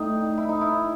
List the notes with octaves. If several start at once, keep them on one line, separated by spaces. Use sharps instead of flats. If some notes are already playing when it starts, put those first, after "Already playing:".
Already playing: A2 G3 D#4
E4
D#4
E4